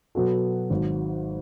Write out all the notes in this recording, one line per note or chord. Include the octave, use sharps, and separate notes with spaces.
B2 F#3 B3 F#4 A4
G#1 G#2 F#3